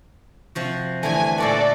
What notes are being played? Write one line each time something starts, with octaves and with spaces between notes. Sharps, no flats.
C3 F3 F#4
G2 D3 E3 A3 G#5
A#2 F#4 A4 B4 D5